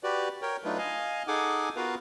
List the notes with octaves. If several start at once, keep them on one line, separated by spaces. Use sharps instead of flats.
F#4 G4 B4 D5
A#4 C#5 G5
F#3 A3 D4 D#4 F4 B4
D#5 F5 G#5
D#4 G#4 A4 F#5 G#5 D6
B3 F4 F#4 A#4 B4 F5